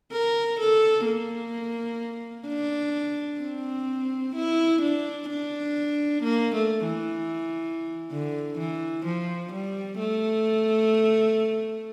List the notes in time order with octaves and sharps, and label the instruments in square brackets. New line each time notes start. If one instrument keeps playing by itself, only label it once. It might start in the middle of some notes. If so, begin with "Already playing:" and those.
[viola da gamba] A#4
A4
A#3
D4
C4
E4
D4
D4
A#3
A3
E3
D3
E3
F3
G3
A3